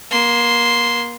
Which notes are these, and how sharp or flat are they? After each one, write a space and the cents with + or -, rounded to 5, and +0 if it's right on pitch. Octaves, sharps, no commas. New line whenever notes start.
A#3 +30 C6 +0